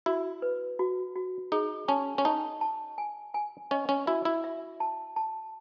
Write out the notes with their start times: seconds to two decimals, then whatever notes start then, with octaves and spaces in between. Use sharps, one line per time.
0.06 E4 F#4
0.42 B4
0.79 F#4
1.16 F#4
1.52 D#4 G#4
1.88 C#4 A5
2.18 C#4
2.25 D#4 A5
2.61 A5
2.98 G#5
3.34 G#5
3.71 C#4 D#5
3.89 C#4
4.07 E4 F#4
4.25 E4
4.44 E5
4.80 A5
5.16 A5